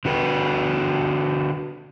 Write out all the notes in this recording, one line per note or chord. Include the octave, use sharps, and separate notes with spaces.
D3 F#4 G4 B4